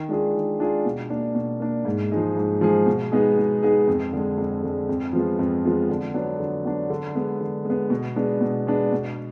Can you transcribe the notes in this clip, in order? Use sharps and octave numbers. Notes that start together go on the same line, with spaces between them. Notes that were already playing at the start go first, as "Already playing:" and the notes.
Already playing: D#3
G#3 D4 F4 G#4
D#3
G#3 D4 F4 G#4
B2
A#3 D4
B2
A#3 D4
G#2
F3 G#3 D#4 G#4
G#2
F3 G#3 D#4 G#4
B2
G#3 B3 D#4 G#4
B2
G#3 B3 D#4 G#4
F2
D3 G#3
F2
D3 G#3
F2
F3 G#3 B3 F4
F2
F3 G#3 B3 F4
D3
F#3 B3 D4
D3
F#3 B3 D4
D3
G#3 B3
D3
G#3 B3
B2
G#3 B3 D4
B2
G#3 B3 D4
B2